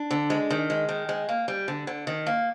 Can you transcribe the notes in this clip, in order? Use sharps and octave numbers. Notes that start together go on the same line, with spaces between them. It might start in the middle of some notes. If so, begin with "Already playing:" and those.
Already playing: D4
D3
G#3
D#3
G#3
D#3
G#3
A#3
G3
D3
D3
D#3
A#3